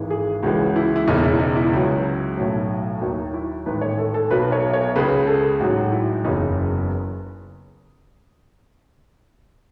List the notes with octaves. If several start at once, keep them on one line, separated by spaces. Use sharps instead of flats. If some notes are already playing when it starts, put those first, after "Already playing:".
Already playing: G#1 G#2 E3 G#3
G#4
C#2 C#3 E3 G#3 F#4
E4
E4
E1 E2 C#3 D#4
E4
D#4
E4
C#2 C#3 F#3
B1 A2 F#3
D#2 D#3 F#3 D#4
E4
A1 G#2 D#3 B4
C#5
A4
A4
B1 B2 F#3 B4
C#5
C#5
C#2 C#3 G#3 B4
A4
A1 G#2 F#3 F#4
E4
F#1 E2 C#3 F#3 D#4